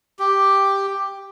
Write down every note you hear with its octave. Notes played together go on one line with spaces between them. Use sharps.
G4